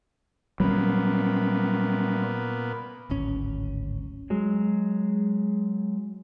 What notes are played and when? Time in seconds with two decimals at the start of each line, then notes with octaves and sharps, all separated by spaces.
0.60 A#2 F#3 G3 B3 C#4
3.10 D1 G#1 C#4
4.30 F#3 G#3